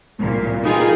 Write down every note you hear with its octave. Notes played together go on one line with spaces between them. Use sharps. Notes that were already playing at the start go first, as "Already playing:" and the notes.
C2 A#2
E3 A#3 D#4 F4 G4 G#4